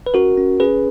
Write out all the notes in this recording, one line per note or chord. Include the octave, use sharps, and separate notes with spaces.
B4
C#4 F#4 A#4
C#4
C#4 G#4 B4